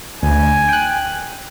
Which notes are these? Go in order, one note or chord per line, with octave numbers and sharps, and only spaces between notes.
D2 G#5
G5 F#6